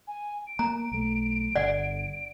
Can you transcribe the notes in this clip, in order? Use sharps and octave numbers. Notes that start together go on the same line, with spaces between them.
G#5
D7
A#3 A#5
B1 A3
G1 D3 D5 F#5